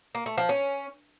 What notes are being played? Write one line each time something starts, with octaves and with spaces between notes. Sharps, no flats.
A#3
A3
F3
C#4